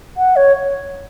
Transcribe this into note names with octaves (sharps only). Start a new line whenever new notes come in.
F#5
C#5